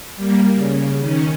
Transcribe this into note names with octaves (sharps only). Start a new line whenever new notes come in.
G3 A#3
C#3
D#3 C#4